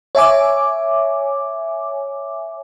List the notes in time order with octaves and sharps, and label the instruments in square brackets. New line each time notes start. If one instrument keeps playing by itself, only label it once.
[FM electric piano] C#5 E5 G#5 D6